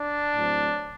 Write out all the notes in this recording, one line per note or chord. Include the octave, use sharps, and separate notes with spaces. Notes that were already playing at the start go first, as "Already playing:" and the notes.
Already playing: D4
A2 F#3 C4